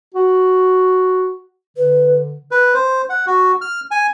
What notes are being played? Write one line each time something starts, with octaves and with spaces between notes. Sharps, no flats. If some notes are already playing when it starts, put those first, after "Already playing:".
F#4
D3 B4
B4
C5
F#5
F#4
F6
G#5